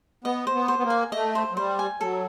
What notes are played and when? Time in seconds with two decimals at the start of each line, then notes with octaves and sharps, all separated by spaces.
0.24 B3 D#5
0.47 C5
0.54 B3
0.68 C5
0.78 B3
0.83 A#3
0.90 G#5
1.12 A3 D#5
1.35 C5
1.52 F#3
1.56 G3 C5
1.79 G#5
2.00 F#3 A4